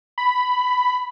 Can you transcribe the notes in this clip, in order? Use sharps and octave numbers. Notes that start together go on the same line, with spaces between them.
B5